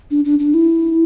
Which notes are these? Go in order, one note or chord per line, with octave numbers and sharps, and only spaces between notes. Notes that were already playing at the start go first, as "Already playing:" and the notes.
D4
D4
D4
E4